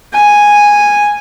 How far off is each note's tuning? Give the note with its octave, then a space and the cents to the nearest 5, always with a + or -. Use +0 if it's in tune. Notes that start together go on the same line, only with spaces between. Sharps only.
G#5 -5